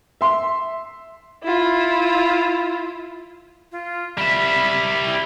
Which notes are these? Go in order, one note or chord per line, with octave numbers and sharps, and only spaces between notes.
E5 C6
E4 F4
F4
G3 E5 B5
E4